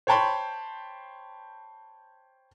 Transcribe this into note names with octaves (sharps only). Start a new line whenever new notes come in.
C5 C#5 G5 A5 B5 C6